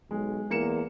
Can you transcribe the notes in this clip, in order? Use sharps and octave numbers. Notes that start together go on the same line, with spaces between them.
B1 G#3
E2 A#3 C#7 E7